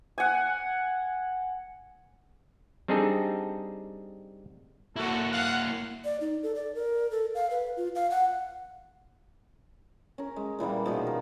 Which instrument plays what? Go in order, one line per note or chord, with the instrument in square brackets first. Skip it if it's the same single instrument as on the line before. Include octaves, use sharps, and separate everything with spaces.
[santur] F#5 G#5
[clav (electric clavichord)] G3 C4 D4 D#4 G#4 A4
[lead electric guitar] A#3 E4 [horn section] F#4 A4
[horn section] F5 F#5
[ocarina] D5
D#4
A4
D5
A#4
A4
F5
B4
F4
F5
F#5
[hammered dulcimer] C#4 A#4
G#3
A#2 E3 G3 A#3
B2 D#3 F3 D#5
A#4